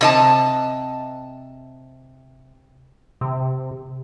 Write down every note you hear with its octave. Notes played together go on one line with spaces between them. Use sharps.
C3 D#5 A5
C3